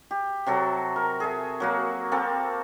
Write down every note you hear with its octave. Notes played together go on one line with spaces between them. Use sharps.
G4
C3 F#3 F#4 A4
A#4
G#4 A4 E5
F#3 A#3 F#4
A#3 C4 A4